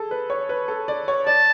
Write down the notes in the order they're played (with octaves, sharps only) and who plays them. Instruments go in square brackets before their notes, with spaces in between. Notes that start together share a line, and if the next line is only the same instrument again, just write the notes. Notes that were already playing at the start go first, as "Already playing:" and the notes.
Already playing: [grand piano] G#4 A4
B4
C#5
B4
A4
D5
C#5
[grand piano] D5 [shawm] A5